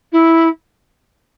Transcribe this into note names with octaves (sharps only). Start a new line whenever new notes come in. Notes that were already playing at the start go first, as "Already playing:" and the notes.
E4